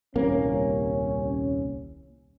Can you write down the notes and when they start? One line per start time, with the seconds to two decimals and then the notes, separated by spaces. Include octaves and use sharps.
0.16 D#1 C2 A#3 C#4